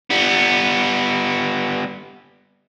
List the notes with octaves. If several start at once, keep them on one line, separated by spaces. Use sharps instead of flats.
G3 B3